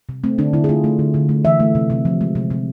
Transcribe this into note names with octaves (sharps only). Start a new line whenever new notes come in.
C3
A3 C4
D3 D4
D3 E4
G#4
A3 F4
A3
D3
D3
A3
E3 E5
A3
C3
C3
F3
G#3
C3
C3